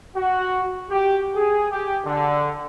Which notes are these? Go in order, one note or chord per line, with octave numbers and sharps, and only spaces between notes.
F#4
G4
G#4
G4
D3